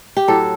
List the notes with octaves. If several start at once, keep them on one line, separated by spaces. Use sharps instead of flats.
G4
A2 F#3 A4